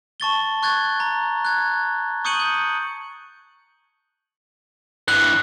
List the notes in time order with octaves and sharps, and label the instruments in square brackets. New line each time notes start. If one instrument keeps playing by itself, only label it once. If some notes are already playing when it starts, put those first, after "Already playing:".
[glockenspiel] A5 C#6 A6 G7
C#6 F#6 G#6 A6
A#5
F#6 G#6
C#6 D#6 G6 C#7 D#7 F#7
G6
[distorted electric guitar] G2 E3 [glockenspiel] F#6